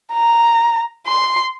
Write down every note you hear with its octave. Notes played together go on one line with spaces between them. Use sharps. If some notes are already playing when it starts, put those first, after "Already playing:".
A#5
C6